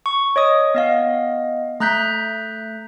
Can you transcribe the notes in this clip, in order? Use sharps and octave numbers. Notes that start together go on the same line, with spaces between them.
C#6
C#5 D#5 D#6
B3 D#5 F5
A3 A#5 F#6 G6 B6